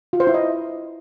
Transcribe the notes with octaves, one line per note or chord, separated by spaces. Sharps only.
F4
C5
E4
D#5